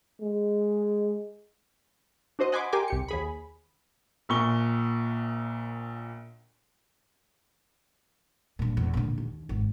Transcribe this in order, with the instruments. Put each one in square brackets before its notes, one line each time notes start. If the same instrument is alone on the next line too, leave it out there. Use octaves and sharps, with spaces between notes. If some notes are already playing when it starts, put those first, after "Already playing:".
[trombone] G#3
[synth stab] D4 F#4 C5 D#5
D#5 F#5 G#5 B5 C6 D6
G4 A#4 G5 G#5 C6 D6
C2 G4 C#7
D#2 G#4 B5
[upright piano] A#1 A#2 C#6 G7
[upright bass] G2 A#2
E2
A#2 D3
D#2
G#1